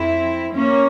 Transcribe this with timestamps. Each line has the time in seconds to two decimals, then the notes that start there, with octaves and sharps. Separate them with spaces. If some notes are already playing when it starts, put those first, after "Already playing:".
Already playing: F2 C4 E4
0.54 A#3 C#4